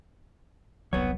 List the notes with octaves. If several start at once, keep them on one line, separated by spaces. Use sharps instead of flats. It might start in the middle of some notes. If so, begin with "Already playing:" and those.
E1 C2 F#3 B3 C#5